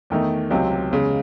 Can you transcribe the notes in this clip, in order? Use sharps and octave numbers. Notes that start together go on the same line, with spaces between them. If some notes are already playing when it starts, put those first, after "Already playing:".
E2 D#3 A3 D#4
C#2 C3 F#3 C4
E2 C#3 G#3